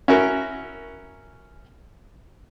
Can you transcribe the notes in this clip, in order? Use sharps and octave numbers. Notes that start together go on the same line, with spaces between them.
C#4 E4 F#4 A#4